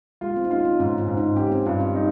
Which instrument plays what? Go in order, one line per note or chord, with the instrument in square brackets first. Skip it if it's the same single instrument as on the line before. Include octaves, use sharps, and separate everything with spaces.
[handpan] G#3 [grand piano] F4
[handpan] C4
D#4
[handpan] C#4 [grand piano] F4
[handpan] D#4
[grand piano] G#2 [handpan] C#4
[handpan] F4
[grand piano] G#2
[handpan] D#4
[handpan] C#4 [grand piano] G4
[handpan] C4
[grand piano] G2 [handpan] F4
[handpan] C#4
[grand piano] D#4